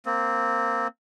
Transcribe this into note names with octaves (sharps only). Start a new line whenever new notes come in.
A#3 C4